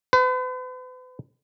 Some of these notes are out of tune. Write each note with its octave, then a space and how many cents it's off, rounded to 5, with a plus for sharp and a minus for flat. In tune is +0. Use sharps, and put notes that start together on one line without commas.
B4 +45